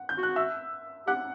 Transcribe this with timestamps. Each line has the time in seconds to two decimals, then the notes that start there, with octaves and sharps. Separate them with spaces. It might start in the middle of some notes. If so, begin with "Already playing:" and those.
Already playing: F#5
0.09 G6
0.18 F#4
0.23 F#6
0.36 E5 E6
1.07 G4 F#5 F#6